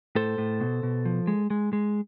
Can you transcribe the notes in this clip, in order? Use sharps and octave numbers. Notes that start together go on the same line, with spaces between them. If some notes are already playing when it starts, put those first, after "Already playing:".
A2 A4 C5
A2
B2
B2
F3
G#3
G#3
G#3